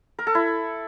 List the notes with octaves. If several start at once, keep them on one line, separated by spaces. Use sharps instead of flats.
A#4
A4
E4